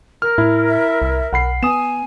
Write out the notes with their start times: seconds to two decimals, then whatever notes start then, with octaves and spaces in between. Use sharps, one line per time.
0.22 A#4 F6
0.38 A2 E4
0.68 E5
1.02 C2
1.33 B1 F#5 B5 C7
1.63 B3 G#5 D#6 E7